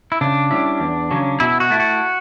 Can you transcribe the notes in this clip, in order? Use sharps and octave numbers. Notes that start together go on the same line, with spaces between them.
E4
C#3 D4
G3 C#4 E4
E2
C#3 F#3 C#4
B2 E4
F#4
A3 E4
F#4